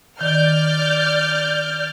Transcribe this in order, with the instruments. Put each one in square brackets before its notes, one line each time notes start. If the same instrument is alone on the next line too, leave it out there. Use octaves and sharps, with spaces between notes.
[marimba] D#3 [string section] D5 F6 G6